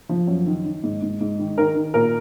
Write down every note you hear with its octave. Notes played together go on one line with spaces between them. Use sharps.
F3
F#2
D#3
D#3
G#2
G#2
G#2
D#3
D#3 A#4
D#3
A#2 A#4